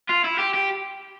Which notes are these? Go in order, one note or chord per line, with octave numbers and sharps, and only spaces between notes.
F4
E4
G4
G4